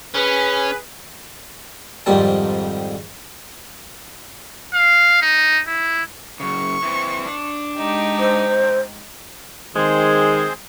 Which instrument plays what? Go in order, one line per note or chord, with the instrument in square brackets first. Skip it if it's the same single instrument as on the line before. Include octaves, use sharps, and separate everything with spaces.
[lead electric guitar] C#4 [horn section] G#4 B4
[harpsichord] F2 G#2 D#3 G3 C4 A5
[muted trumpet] F5
D#4
E4
[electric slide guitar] F#2 C#3 [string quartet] C#6
[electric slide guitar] E3 C4
D4
[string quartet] G#3 D#4 G4
[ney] C5
[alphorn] D#3 [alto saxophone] G#3 [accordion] C4 G#4 C5